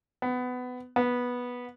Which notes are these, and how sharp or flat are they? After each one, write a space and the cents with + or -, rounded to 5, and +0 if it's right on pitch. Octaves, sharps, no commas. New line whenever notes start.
B3 +20
B3 -10